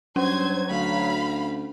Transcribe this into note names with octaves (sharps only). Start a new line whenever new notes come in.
G2 F#3 C#4 C5 G#6
D2 F5 B5